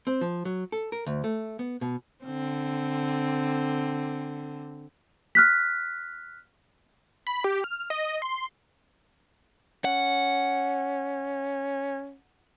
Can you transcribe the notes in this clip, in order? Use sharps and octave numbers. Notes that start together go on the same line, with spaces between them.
C4
F3
F#3
A4
A#4
D2
A3
B3
B2
D3 C4
F6 F#6 B6
B5
G4
F6
D#5
C6
C#4 F#5